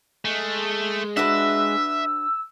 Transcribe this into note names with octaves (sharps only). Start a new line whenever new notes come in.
G#3 A3
D4 F#4 B4 E5 E6